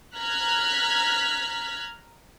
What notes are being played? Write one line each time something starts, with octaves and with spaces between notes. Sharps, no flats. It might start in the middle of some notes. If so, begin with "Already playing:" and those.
A#5 F6 F#6 G#6 B6